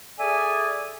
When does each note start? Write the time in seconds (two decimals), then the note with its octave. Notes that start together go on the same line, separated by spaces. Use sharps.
0.19 G#4 A4 D5 E5 G#5